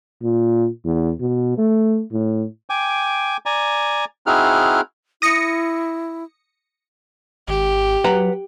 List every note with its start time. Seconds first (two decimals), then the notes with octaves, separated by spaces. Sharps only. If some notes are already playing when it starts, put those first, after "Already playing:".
0.22 A#2
0.85 E2
1.21 B2
1.58 A3
2.12 A2
2.70 G5 G#5 D6
3.46 D5 G#5 A#5
4.27 C4 D#4 E4 F#4 G#4 F6
5.22 E4 D#6 A#6 C#7
7.48 G#1 G4
8.04 F#3 B4 F#5 A#5